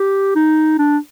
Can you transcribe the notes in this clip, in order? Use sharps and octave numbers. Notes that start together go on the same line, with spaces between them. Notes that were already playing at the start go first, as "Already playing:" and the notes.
Already playing: G4
D#4
D4